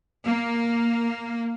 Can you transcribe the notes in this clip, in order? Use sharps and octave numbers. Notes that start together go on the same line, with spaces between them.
A#3